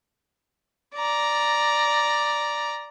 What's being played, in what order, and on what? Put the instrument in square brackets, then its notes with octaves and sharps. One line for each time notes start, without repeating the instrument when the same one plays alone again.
[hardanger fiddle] D5 A#5